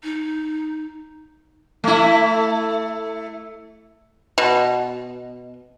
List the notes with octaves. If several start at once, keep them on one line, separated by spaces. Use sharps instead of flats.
D#4
A3 E4
B2